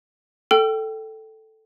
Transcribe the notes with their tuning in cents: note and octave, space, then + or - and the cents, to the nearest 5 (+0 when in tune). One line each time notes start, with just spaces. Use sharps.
A4 +0 G5 -15 E6 +45